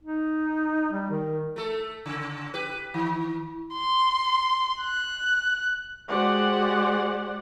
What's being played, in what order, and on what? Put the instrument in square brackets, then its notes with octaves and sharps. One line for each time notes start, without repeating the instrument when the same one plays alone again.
[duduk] D#4
G3
D#3
[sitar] A3 A4
C#3
G4 B4
D#3
[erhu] C6
F#6
[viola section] G#3 F#4 G4 C5 D5 F#5